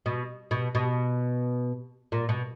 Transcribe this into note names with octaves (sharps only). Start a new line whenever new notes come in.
B2
B2
B2
A#2
B2